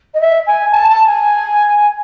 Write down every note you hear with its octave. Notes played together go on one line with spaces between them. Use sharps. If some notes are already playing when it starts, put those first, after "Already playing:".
D#5
E5
G#5
A5
A5
G#5